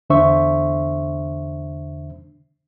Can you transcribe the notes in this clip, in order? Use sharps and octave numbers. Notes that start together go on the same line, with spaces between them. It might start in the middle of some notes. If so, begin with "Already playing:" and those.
E2 D3 D4 C5 E5 C#6